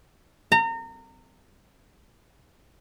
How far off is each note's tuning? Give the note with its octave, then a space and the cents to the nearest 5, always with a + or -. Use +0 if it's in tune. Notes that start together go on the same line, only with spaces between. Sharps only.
A#5 -30